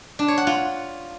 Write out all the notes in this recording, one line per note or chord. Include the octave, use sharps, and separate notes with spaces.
D4
C#5
F#5
F4